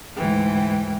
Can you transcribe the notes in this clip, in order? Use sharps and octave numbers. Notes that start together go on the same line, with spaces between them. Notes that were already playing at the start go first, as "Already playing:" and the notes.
D2 G#2 E3 G5